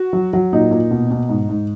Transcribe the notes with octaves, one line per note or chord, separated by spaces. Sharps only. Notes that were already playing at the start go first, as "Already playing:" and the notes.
Already playing: F#4
F#3
F#3
A#2 D#4
A#2
B2
B2
G#2
G#2